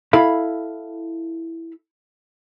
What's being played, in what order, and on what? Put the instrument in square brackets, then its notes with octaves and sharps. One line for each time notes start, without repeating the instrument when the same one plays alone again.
[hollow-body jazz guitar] E4 A4 F5 B5